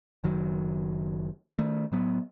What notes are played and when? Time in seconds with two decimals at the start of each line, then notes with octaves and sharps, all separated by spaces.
0.24 F#1 D#3 F#3
1.59 D#3 A3
1.92 A2 F#3 B3